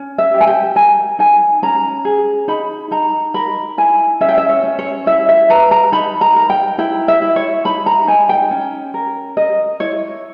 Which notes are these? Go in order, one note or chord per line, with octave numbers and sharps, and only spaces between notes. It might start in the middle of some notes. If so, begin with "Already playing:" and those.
Already playing: C#4
E5
G4
G#5
G5
A#4 G#5
D#4 G#5
C#4 A#5
G#4
D#4 B5
D#4 A#5
A#4 B5
E4 G#5
C#4 E5
G5
E5
C#5
C#4
C#5
E4 E5
E5
B4 A#5
A#5
D#4 B5
A#5
A#4
G5
E4 G5
E5
E4
C#5
D#4 B5
A#5
D#4 G#5
G5
C#4
A#4
A#4 D#5
E4 C#5